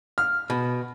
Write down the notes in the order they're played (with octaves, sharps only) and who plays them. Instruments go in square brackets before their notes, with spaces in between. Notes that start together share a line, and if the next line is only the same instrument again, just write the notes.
[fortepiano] F6
[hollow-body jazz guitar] B2